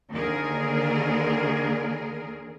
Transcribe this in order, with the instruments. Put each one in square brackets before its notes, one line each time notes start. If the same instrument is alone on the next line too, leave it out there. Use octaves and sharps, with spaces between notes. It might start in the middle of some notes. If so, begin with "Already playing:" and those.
[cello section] D#2 D3 G#4 A#4